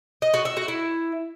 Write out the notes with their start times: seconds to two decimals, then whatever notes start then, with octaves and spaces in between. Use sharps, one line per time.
0.22 D#5
0.34 F#4
0.45 E5
0.57 F#4
0.68 E4